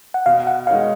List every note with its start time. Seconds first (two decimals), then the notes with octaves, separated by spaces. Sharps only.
0.14 F#5
0.26 B2 F5
0.47 F#5
0.67 G#3 D#4 A#4 C#5 F5